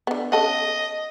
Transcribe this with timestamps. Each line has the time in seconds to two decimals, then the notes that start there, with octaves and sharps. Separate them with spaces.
0.07 D3 B3
0.32 C#3 A4 D#5 F#5